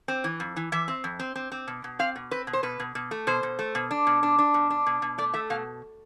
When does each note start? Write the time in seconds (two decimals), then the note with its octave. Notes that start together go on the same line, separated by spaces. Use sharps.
0.08 C4
0.24 E3
0.40 F2
0.56 E3
0.72 E3 E5
0.88 C4
1.04 F2
1.19 C4
1.36 C4
1.52 C4
1.67 B2
1.84 B2
1.99 C4 F5
2.16 B2
2.31 C4 B4
2.47 B2
2.53 C5
2.63 B2 B4
2.80 B2
2.95 B2
3.11 A3
3.27 B2 C5
3.43 B2
3.59 A3
3.75 B2
3.91 D4
4.07 B2
4.23 D4
4.39 D4
4.54 B2
4.70 D4
4.86 B2
5.02 B2
5.18 A3 D5
5.34 A3 E5
5.50 B2 F5